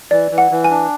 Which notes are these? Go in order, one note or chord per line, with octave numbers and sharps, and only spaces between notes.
E3 D5
E3
F#5
E3
G#5
D4